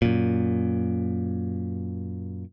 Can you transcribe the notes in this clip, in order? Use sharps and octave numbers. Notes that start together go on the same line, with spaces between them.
F#2 A#2